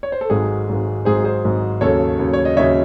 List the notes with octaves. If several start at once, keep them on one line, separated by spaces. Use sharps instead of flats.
C#5
C5
A4
G#1 G#2 F#3 G#4
G#1 G#2 F#3
G#1 G#2 F#3 G#4 C5
G#4 C5
G#1 G#2 F#3
D#2 C#3 F#3 A4 C#5
D#2 C#3 F#3
C#5
D#5
D#2 C#3 F#3 C#5 E5